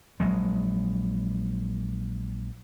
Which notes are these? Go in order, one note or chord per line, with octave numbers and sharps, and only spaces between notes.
A#1 F#3 G#3